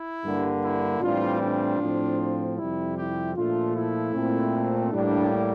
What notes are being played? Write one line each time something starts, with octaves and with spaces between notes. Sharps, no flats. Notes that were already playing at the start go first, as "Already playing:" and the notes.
Already playing: E4
G2 D3 G3 A#3
E4
A2 E3 G3 C4 D4 F4
D4 F4
A2 F3 C4
F2 C3 G3 E4
E4 G4
A#2 F3 A3 D4 F4
E4
A#2 A3 C4
A2 G3 A#3 D4